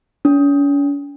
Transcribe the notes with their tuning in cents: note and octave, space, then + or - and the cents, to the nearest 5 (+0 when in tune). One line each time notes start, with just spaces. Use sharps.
C#4 +40